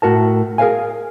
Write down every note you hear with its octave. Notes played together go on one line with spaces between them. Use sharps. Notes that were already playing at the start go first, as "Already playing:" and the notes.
A2 F#4 A#4 A5
G#4 A#4 B4 C#5 F5 G#5